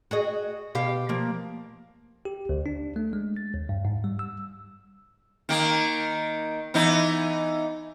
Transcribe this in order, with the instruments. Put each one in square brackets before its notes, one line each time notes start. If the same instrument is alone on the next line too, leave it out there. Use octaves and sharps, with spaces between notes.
[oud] F#4 G#4 D#5
B2 G4 F5
F3 A#3
[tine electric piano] G4
D2
D4
A3
G#3
A6
D#2
G2
G#2
G3
E6
[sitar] D#3 A#3
E3 B3 D#4